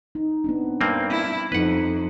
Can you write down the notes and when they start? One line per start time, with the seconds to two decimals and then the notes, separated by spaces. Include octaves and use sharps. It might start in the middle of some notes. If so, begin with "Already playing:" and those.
0.15 D#4
0.44 B3 C4 D4
0.81 G2 G3 A#3 C4
1.10 E4
1.52 F2 D#4 B4 F#5